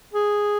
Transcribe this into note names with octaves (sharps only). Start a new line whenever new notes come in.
G#4